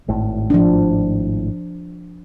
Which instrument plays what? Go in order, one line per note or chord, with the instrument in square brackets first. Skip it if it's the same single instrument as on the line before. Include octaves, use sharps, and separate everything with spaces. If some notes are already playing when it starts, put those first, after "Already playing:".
[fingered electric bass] G#1 A2
[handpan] F3 D4